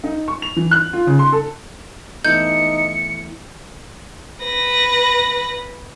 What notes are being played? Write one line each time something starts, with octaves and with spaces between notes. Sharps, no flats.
D#4
C#6
F7
E3
F#6
F4
C#3
C6
A4
E3 A3 B3 D#4 G6 C#7
B4 A#6